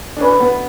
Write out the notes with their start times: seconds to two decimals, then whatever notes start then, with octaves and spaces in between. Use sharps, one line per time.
0.17 D4
0.21 C#4 B4
0.40 B3